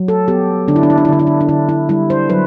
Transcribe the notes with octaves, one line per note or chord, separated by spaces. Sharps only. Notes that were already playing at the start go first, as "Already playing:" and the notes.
Already playing: F#3
A4
B3 G4
D3 D4
E4
D4
E4
D4
E4
D3 D4
E4
D4
D4
D3 E4
E4
G3 E4
C5
F#3 B4